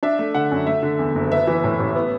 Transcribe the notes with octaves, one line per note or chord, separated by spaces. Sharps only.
D4 E5
A3
D3 F#5
F#2
A3 E5
D3
E2
F#1
B3 E5
E3
A2
A1
B3